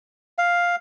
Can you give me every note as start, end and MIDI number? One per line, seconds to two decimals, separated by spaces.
0.38 0.76 77